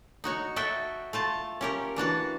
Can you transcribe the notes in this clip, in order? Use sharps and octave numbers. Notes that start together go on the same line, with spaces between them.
D#4 F#4 C#5
F#4 A4 E5 G5
A3 F4 A5
C#4 G4 A#4
E3 D4 F#4 A5